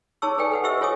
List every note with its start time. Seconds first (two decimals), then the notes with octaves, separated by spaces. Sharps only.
0.22 D#4 G#4 C#5 A5 C#6 E6
0.38 A4 B4 D5 G5 G#5
0.52 A4 B4 F#5
0.64 G4 C5 D#5 E5 C#6 E6
0.81 F4 A4 C#5 G#5 D6 D#6